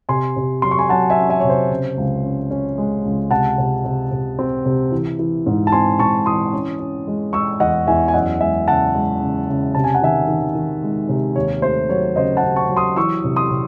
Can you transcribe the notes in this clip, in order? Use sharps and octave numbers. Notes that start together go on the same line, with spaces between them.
C3 G#5 C6
C3
F#3 C6
C#6
G#5 C6
F#3 F#5 A5
E5 G#5
C#4
E5 G#5
C3 C#5
C5
C#3
C#2
C#4
C#4
G#3
C#2
C3 F#5 A5
C3
C3
C3
C4
C3
E3
E3
G#2
A5
C4 G#5 C6
G#2 A5 C#6
E3 C6 D#6
C#4
C#4
G#3
G#3 C#6 E6
E2 D#5 F#5
E2 E5 G#5
G#5
F#2 D#5 F#5
G#3 E5 G#5
C#3 F#5 A5
G#3
C#3
C#3
C3 A5
G#5
F#5
D#3 E5 G#5
D#3
D#3
G#3
C3
D#2 C#5
A3 C5
F#3 C#5
C#3 C5 D#5
F#5 A5
C#3
A5 C#6
F#3
C6 D#6
E3 C#6 E6
C3
C6 D#6
C3